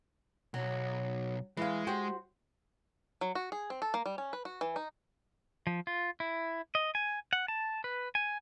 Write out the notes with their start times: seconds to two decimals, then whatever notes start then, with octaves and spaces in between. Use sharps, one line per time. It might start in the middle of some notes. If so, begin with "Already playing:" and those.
0.54 B1 F#3
1.57 E3 G#3 F5
1.87 F#4 G4 C5
3.21 F#3
3.35 F#4
3.52 G#4
3.70 C4
3.82 A4
3.94 A#3
4.06 G3
4.18 C#4
4.33 B4
4.45 F#4
4.61 E3
4.76 D#4
5.67 F3
5.87 F4
6.20 E4
6.75 D#5
6.95 G#5
7.33 F#5
7.48 A5
7.84 B4
8.15 G#5